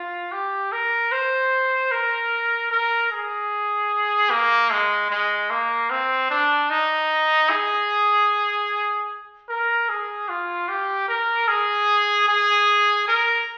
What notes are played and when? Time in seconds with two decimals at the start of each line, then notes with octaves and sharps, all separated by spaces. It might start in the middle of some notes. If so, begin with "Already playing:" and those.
Already playing: F4
0.32 G4
0.72 A#4
1.12 C5
1.92 A#4
2.72 A#4
3.11 G#4
4.31 A#3
4.71 G#3
5.11 G#3
5.50 A#3
5.90 C4
6.30 D4
6.70 D#4
7.50 G#4
9.49 A#4
9.89 G#4
10.29 F4
10.69 G4
11.09 A#4
11.48 G#4
12.29 G#4
13.08 A#4